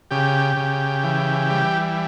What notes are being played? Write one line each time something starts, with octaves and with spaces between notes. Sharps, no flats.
C#3 G4
C#3
E3
G3